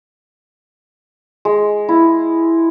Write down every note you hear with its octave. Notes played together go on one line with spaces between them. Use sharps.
G#3
E4